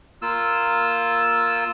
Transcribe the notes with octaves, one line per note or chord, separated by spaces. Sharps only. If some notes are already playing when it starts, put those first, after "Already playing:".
A#3 F4 E6